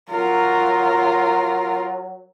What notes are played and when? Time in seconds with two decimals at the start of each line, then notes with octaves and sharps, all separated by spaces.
0.10 F#3 F4 A#4